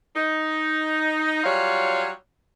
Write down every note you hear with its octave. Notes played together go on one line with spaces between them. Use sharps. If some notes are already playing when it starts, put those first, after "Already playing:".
D#4
F#3 G3 F4 C#5